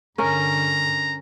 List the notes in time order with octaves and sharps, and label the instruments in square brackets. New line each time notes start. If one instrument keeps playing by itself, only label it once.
[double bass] G2 D3 [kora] C#4 A#4 [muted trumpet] A#5